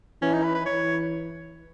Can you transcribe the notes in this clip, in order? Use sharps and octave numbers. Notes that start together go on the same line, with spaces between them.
E3 C#4
D#4
B4
B4
E3 C#5